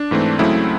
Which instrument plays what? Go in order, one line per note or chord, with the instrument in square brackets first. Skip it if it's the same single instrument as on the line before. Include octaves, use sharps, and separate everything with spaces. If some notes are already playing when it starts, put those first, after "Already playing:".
Already playing: [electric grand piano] D4
G#2 E3 A3 C4
C#2 C#3 F#3 A3 C4 E4